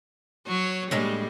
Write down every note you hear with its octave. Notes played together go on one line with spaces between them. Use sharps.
F#3 C#5
A2 G3 G#3 A#3 D4